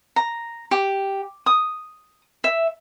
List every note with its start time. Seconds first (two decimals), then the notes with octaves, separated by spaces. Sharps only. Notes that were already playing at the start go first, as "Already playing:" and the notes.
0.16 A#5
0.71 G4
1.46 D#6
2.44 E5